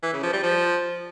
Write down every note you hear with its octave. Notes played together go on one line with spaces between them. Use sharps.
E3
C#3
F3
G3
F3